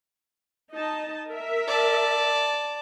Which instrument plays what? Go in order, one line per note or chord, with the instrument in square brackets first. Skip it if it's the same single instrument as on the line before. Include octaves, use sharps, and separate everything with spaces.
[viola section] D#4 D#5 A5
A#4 E5
[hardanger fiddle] D5 A5